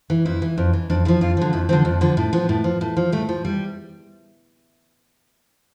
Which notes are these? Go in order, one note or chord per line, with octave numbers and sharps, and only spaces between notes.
E3
F2 E4
E3
F2
E3
F2 D4
D3 F3 E4
F2 F4
D3 F3
F2 E4
D3 F3 C4
F2
D3 F3
A2
F3 B3
A2
F3
A2
F3
A2 A3
F3
G3